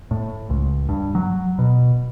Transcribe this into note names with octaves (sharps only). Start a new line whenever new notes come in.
A2
C#2
G2
F#3
B2